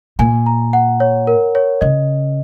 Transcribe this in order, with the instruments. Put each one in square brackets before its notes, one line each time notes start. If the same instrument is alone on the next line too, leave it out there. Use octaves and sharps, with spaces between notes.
[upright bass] A#2 [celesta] G#5
[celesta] A#5
F#5
C#5
A#4
C#5
[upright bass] C#3 [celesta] D#5